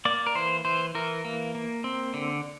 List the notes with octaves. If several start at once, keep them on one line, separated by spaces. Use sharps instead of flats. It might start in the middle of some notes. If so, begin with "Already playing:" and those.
A#3 D5
A#4
E3 C5
E3 C5
E3 A#4
A#3
A#3
C4
D3